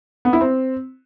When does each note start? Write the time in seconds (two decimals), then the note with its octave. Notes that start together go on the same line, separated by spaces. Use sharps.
0.25 B3
0.33 E4
0.41 C4